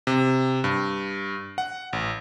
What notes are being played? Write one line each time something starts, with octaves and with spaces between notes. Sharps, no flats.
C3
G2
F#5
A1